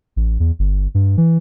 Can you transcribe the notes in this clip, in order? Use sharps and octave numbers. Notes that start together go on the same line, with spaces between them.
A1
E2
G1
G2
E3